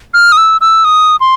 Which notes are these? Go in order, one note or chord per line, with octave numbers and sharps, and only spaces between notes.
F6
D#6
E6
E6
D#6
C6